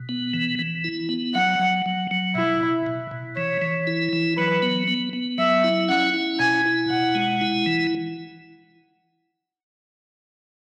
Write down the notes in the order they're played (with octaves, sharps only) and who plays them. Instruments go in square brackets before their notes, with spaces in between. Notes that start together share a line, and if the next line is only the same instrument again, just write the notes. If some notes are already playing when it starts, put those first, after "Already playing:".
Already playing: [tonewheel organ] B2
B3
E3
E3
E4
B3
[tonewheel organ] F#3 [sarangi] F#5
[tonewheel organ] F#3
F#3
F#3
[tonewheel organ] B2 [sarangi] E4
[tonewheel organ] B2
B2
B2
[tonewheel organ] E3 [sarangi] C#5
[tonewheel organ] E3
E4
E3
[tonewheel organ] F#3 [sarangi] B4
[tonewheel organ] B3
B3
B3
[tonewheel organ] F#3 [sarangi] E5
[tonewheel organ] E4
[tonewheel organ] C#4 [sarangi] F#5
[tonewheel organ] E4
[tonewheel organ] B2 [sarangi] G#5
[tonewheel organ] E4
[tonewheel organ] B2 [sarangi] F#5
[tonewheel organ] G#3
E4
E3